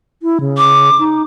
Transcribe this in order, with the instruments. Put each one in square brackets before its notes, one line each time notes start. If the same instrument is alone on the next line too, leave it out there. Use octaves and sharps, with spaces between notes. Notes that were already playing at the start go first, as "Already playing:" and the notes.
[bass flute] E4
C#3
[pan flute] D6
[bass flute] D#4